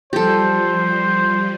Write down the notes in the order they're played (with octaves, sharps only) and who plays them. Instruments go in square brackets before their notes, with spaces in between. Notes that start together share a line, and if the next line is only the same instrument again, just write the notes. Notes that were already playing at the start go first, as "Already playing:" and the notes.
[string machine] F3 G3 [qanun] G4 A4 [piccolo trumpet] C5